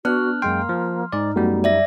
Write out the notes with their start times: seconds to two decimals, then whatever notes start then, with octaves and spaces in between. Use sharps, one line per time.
0.05 B3 D4 F#4 D5 F6 F#6
0.42 F#2 G#3 A#3 G5 C6 F6
0.69 F3
1.12 G#2 D#4 D5
1.36 F#2 G3 A3 B3 F#4
1.64 D5 E5 A#6